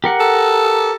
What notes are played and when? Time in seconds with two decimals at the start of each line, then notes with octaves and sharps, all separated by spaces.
0.04 G4 A#4 F#5
0.20 A4